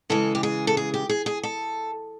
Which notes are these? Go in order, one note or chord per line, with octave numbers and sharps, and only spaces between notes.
C#3 E3 G#3 A4
G4
G#4
A4
G#4
G4
G#4
G#4
A4